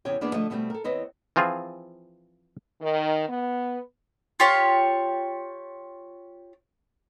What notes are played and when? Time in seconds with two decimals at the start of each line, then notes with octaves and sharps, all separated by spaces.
0.05 E2 C3 C#4 C#5 G5
0.21 E2 A#3 B3 D4 G#4 D5
0.34 D3 F3 A3 D#5
0.50 B2 D3 F3 G3 A3 C4
0.70 A4 A#4
0.84 E2 C4 B4 C#5 D#5
1.36 E3 F3 C4 F4 G#4
2.81 D#3
3.28 B3
4.40 F4 G4 C#5